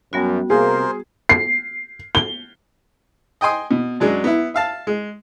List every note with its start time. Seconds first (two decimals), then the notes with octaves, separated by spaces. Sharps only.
0.13 F#2 G3 B3 F#4
0.50 C3 A#3 G#4 A#4 C5
1.29 C7
2.15 G7
3.41 D#5 G5 G#5 C6 D#6
3.71 B2
4.00 F#2 F#3 G#3 D4
4.24 B3 E4
4.54 E5 F5 A5
4.87 G#3